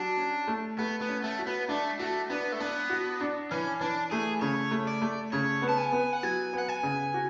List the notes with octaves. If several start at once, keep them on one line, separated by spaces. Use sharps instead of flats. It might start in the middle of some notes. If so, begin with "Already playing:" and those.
Already playing: F#3 D4
C#4
A3
A3 B3
B3
C#4
A3
F#4
B3
A3 D4
A3 F#4
B3 D4
A3
B3 D4
F#4
D4
E3 C#4
E3 D4
A3 G#4
C#3 C#5
A3
D5
A3
C#3 C#5
B3
A5
G#5
B3
F#5
F#3 G#5
B3
F#5
G#5
C#3
F#4